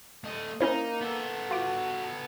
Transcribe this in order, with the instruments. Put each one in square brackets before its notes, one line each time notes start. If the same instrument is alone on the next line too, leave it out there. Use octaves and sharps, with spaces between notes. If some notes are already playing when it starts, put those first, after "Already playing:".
[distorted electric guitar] A3 D#5
[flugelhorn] A#3 [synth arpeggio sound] C#4 E4 C5 [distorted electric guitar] D#4
[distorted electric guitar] B3 A4
[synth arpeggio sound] F4 D6 [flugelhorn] F#4